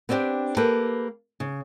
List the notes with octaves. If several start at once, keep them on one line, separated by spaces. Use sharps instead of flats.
B3 C4 D4 F4 G4
A#3 G4 A4 B4
C#3